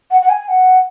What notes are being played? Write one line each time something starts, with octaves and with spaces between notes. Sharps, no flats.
F#5
F#5
G#5
F#5